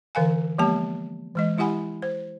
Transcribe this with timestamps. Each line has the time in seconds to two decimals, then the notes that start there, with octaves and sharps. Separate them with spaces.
0.15 D3 E3 A#4 F5 G#5
0.58 F3 G#3 A#3 B3 G4 A5
1.35 E3 G#3 D#5
1.58 G#3 E4 G4 F#5 G#5 B5
2.02 C5